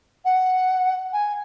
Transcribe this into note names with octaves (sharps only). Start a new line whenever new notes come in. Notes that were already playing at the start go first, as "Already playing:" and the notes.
F#5
G#5